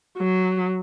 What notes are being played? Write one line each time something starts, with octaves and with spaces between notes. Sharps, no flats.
F#3